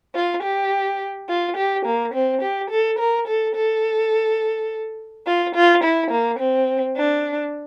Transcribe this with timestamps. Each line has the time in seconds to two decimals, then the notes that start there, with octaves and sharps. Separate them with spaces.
0.15 F4
0.43 G4
1.29 F4
1.57 G4
1.85 A#3
2.14 C4
2.42 G4
2.70 A4
2.99 A#4
3.27 A4
3.55 A4
5.27 F4
5.55 F4
5.83 E4
6.11 A#3
6.40 C4
6.97 D4